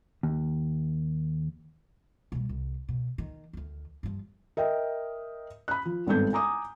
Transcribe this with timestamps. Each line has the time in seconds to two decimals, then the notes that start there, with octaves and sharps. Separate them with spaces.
0.23 D#2
2.32 B2 G3
2.49 C2
2.89 B2
3.18 D#3
3.53 D2 D#3
4.03 G2 F3
4.57 A#4 D#5 E5 G5
5.68 B5 F#6
5.85 F3
6.07 G#1 G2 B3 C4 A4 G6
6.33 G#5 A#5 D6 D#6